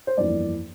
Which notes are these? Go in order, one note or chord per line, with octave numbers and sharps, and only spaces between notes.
C5
G1 F2 E3 A#3 D5